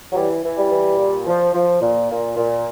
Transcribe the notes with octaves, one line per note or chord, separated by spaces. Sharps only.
F#3
E3 G3
E3
G3
E3
A#2
F3
F3
A#2
A#2
A#2